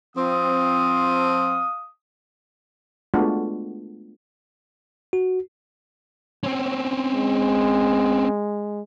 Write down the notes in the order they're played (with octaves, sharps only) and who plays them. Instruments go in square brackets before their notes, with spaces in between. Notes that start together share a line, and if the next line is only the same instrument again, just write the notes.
[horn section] F3 C4 [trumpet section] F5 D#6
[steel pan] G#3 A3 B3 D4 F4 F#4
[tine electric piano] F#4
[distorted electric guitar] C4 C#4
[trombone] G#3